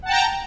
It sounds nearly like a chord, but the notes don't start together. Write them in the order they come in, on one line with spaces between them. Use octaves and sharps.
F#5 A5 G5 A#5